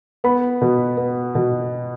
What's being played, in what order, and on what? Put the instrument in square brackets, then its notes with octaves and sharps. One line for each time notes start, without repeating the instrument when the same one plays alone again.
[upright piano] B3 B5
B2
B3
B2